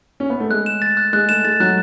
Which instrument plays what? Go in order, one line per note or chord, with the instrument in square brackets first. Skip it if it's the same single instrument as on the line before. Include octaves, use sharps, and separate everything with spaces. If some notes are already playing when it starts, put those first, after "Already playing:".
[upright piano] C#4
B3
A3
[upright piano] G#3 [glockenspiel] F#6
[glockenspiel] E7
A6
F#6
[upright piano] G#3 [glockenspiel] F#6
[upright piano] A3 [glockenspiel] E7
[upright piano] G#3 [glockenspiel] A6
[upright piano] F#3 [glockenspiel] F#6